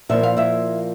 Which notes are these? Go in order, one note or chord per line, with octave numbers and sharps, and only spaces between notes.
A#2 F3 A#3 E4 E5
F5
E4 E5